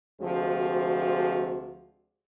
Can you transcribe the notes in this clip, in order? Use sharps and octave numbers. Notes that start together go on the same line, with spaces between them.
D2 C3 F3 G#3 F#4